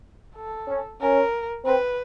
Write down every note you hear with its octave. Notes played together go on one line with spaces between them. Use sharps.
A4
C#4
C#4 A#4
C4 B4